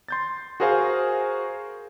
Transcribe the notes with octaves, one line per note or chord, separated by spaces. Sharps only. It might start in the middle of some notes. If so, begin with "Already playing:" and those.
C6 G6 A6
F#4 G#4 A#4 C5 F5 G#5